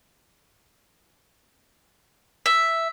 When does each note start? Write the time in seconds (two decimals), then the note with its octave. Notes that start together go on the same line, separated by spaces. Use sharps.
2.46 E5